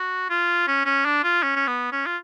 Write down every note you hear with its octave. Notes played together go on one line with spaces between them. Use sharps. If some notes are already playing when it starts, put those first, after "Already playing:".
Already playing: F#4
F4
C#4
C#4
D4
F4
C#4
C#4
B3
C#4
F4